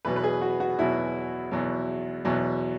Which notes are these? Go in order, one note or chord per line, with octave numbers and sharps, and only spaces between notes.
E2 B2 F#3 B4
B4
G#4
F#4
F#4
E2 B2 F#3 E4
E2 B2 F#3
E2 B2 F#3